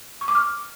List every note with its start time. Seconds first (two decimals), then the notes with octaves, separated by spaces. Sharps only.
0.21 C#6
0.28 D6
0.35 F6